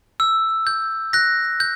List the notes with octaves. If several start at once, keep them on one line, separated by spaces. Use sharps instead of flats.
E6
G6
F#6 A#6
G6